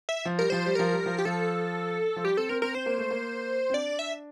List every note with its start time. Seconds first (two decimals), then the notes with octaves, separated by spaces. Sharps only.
0.09 E5
0.25 F3
0.39 G3 A#4
0.50 F3 C5
0.66 G3
0.75 F3 A#4
0.92 G3
1.06 F3
1.18 G4
1.25 F3 A4
2.16 F3
2.24 G3 G4
2.37 C4 A4
2.49 C4 A#4
2.62 C4 A#4
2.75 C4 C5
2.86 A#3
2.98 A3
3.11 A#3
3.70 C4
3.73 D4 D5
3.99 E5